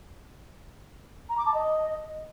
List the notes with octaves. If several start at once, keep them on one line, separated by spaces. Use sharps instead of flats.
A#5
D6
A5
D#5